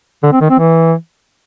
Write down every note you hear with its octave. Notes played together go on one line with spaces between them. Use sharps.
D3
C4
D#3
C4
E3